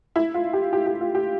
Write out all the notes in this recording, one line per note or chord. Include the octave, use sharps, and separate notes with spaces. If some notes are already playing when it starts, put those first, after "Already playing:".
E4
F4
G4
G4
G4
F4
G4